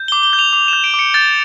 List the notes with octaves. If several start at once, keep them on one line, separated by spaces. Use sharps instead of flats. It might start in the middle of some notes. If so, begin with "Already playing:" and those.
Already playing: G6
G7
D6
G7
G6
F7
D6 F7
E7
G6
D7
D6
C#7
G6 A6